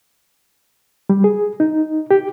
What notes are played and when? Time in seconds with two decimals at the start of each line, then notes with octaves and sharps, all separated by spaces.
1.10 G3
1.24 G#4
1.60 D#4
2.11 G4